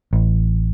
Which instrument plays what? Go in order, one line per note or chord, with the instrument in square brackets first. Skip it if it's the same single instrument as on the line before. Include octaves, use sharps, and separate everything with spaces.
[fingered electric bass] A1